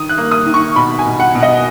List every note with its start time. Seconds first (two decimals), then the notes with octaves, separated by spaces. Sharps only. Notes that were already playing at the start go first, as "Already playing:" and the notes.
Already playing: D#3 D#6
0.09 F#6
0.18 A#3
0.31 D#6
0.46 D#3
0.54 C#6
0.76 B2 B5
0.99 G#5
1.06 B2
1.20 F#5
1.35 B2
1.43 D#5